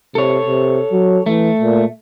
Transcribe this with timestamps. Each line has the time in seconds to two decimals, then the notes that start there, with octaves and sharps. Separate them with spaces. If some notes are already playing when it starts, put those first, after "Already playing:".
0.15 C3 A4 C#5
0.47 C3
0.92 F#3
1.26 E3 A3
1.61 A#2